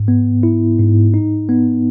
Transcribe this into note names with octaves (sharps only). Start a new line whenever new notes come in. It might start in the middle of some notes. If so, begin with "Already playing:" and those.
Already playing: G#2
B3
E4
G#2
D#4
B3